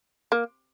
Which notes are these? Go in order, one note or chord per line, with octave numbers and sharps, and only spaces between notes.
A#3